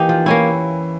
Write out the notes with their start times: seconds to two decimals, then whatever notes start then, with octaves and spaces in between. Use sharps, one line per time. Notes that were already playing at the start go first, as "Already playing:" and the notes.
Already playing: E3 A#3 D#4 G4
0.09 F3
0.26 A#3 C#4 E4